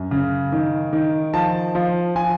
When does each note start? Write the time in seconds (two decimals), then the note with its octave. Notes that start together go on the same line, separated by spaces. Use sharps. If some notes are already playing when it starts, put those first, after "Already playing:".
Already playing: F#2
0.11 C#3
0.52 D#3
0.93 D#3
1.34 F3 A5
1.75 F3
2.16 F3 G#5